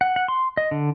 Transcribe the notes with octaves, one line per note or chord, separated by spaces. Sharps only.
F#5
F#5
C6
D#5
D3